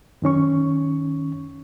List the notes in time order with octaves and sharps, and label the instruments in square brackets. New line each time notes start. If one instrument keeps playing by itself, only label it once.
[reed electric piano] F#2 D#3 C#4 C#6